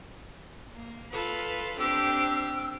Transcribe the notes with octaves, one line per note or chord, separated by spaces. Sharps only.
A#3
F4 A4 B4
C4 D4 G4 E6